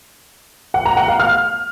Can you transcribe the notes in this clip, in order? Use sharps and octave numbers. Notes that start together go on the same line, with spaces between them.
F#5
A#5
F#5
F5
F6